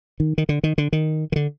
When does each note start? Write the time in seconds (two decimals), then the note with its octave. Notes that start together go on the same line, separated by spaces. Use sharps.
0.20 D#3
0.38 D#3
0.49 D3
0.63 D#3
0.78 D3
0.93 D#3
1.32 D#3
1.36 D3